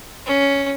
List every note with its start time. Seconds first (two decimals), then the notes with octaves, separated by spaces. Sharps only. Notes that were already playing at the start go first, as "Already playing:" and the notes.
0.26 C#4